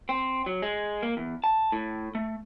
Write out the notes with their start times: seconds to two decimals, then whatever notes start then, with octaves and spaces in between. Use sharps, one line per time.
0.09 C4
0.46 F#3
0.62 G#3
1.03 A#3
1.17 E2
1.44 A5
1.72 A2
2.15 A3